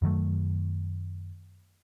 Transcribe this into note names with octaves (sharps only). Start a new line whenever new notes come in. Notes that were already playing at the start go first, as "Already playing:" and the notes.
F#2 D#3 F#3 A3